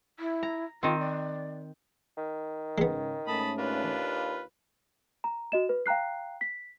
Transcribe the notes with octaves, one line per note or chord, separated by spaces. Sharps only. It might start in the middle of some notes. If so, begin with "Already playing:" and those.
E4
A#5
D#3 C4 F4
D5
D#3
G#2 C#3 G#3 B3
G#2 A3 C#4 A5 B5 D#6
D#2 D4 F4 B4
A#5
F#4 D#5 E7
B4
F5 G5 A#5 F#6 C7
B6